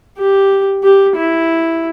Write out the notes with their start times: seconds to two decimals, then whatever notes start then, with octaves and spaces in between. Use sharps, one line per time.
0.18 G4
0.84 G4
1.16 E4